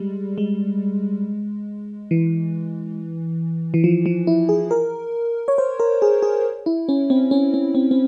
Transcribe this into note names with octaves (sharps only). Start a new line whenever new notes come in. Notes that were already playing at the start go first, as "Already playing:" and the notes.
Already playing: G3 G#3
G#3
E3
E3
F3
F3
E4
G#4
A#4
C#5
C5
A#4
G#4
G#4
E4
C#4
C4
C#4
C#4
C4
C4